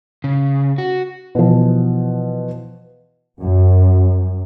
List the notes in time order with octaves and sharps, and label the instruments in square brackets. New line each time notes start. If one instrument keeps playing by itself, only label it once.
[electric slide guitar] C#3
F#4
[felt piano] B2 E3 F3
[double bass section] F#2